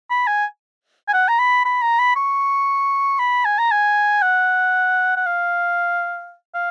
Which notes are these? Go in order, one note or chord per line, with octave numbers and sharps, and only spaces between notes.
B5
G#5
G#5
F#5
A#5
B5
B5
A#5
B5
C#6
B5
G#5
A#5
G#5
F#5
F#5
F5
F5